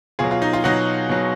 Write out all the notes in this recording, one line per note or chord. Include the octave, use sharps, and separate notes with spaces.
B2 F#3 F4 G#4
F4
D#4
F4
B2 F#3 D#4 F#4
B2 F#3